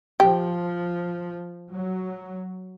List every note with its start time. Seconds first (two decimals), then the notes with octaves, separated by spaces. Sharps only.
0.20 F3 G4
1.72 F#3